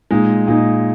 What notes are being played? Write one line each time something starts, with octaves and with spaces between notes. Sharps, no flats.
A#2 G#3 D#4
A#2 G#3 D#4